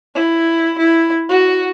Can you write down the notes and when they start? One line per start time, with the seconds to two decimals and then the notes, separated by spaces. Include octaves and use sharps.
0.15 E4
0.79 E4
1.29 F#4